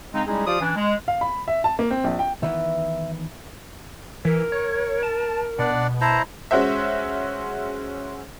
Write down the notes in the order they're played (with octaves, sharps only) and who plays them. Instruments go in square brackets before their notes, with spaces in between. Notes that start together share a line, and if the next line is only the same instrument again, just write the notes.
[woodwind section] C#3 G#3 C4 D#4
G3 G#3 C#4 D#4 E4 G#4
F3 F4 G4 D5 F5 D#6
E3 C#4 D4
G#3
[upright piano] F5
B5
E5
A5
A#3
C4
A#1
G5
[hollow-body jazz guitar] D#3 E3 B3 [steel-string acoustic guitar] E5
[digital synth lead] E3 [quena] A#4
[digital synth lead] C#5
A5
[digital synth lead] B2 [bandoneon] D4 D5 F#5
[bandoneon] E4 C5 A#5 [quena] A5
[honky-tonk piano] G#3 C#4 F#4 C5 E5